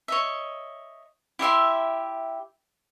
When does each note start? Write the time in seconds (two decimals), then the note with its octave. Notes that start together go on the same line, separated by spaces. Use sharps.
0.08 C#5 D#5 E5
1.39 E4 G4 E5 C6